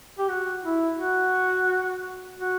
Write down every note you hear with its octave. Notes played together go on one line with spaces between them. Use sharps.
G4
F#4
E4
F#4
F#4